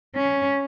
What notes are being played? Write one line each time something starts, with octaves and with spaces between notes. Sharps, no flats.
C#4